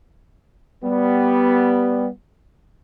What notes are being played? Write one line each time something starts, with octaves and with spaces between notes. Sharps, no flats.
G3 B3